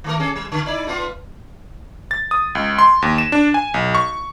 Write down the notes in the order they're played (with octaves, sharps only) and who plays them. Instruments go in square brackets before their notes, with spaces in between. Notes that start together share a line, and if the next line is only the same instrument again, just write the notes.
[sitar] D#3 A3 A#4
C#4 G#4 A4
G3
D3
D#4 E4 D5
A3 B3 F4
[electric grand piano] A6
D#6
C#2
C6
D#2
E7
D4
G#5
B1
C#6